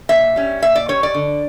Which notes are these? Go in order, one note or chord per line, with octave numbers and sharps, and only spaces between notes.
A#2 E5
G3 C#4
A#2 E5
D5
G3 C#4 C#5
D5
D3